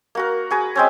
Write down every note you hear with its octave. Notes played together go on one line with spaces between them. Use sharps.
A#3 F#4 A#4
F#4 G#4 B4
G#3 C4 C#4